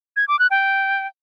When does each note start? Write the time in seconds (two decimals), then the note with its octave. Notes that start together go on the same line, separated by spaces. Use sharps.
0.16 G#6
0.28 D6
0.39 F#6
0.51 G5